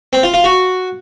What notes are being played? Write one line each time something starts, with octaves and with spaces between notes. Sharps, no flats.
C4
F4
F4
F#4